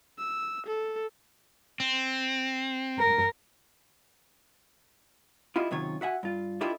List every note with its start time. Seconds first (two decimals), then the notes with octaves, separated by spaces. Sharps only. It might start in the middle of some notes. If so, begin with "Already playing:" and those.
0.18 E6
0.67 A4
1.80 C4
2.99 A#4
5.56 E4 F4 G4 D#5
5.71 F#2 C3 D#3 F4 C#5
6.01 F#4 E5 F#5 G#5
6.23 G2 F4
6.61 D4 E4 F4 G4 A4 D#5